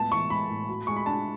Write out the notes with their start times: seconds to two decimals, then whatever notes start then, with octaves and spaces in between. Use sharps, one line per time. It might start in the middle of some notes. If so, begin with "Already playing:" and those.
Already playing: A2 G#3 B3 A5
0.12 E3 C#6
0.30 G#3 B5
0.49 A2
0.69 F#4
0.87 G#3 C#6
0.96 B5
1.06 D4 A5